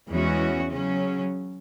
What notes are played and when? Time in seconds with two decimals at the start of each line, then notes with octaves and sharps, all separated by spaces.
0.09 E2 E3 G#3 C#4 F#4
0.72 C#3 F#3 C#4